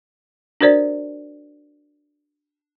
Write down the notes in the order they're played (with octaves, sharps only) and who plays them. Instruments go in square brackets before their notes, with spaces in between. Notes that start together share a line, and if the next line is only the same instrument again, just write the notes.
[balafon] D4 F#4 A#4 C5 D5